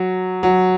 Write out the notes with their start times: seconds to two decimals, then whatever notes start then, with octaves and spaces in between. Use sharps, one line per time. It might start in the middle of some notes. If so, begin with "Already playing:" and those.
Already playing: F#3
0.43 F#3